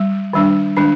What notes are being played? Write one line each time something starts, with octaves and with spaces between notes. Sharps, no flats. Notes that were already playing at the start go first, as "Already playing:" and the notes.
Already playing: G3
D#3 G3 D4
D#3 G#3 D4